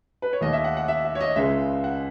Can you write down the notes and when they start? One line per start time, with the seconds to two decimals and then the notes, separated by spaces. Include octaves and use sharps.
0.22 B4
0.33 C#5
0.41 D#2 D#3 A3 D#5
0.53 E5
0.64 F#5
0.77 F#5
0.88 E5
1.04 E5
1.15 C#5
1.21 D#5
1.36 C#2 C#3 G#3 E5
1.84 F#5